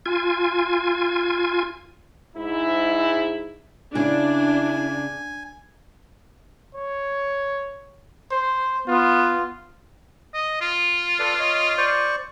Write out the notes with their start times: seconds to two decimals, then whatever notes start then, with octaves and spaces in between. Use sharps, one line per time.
0.06 F4 G#5
2.36 G#2 E4
3.95 C#3 D4 E4 G#5
6.75 C#5
8.31 C5
8.88 B3 F4
10.34 D#5
10.61 F4
11.19 A4 B4 D5
11.39 C#5 D#5
11.78 C5 D5 C#6